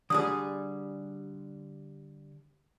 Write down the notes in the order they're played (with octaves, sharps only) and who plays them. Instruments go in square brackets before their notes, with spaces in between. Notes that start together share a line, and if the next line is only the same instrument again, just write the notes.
[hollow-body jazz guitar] D3 G3 G#4 [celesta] D#6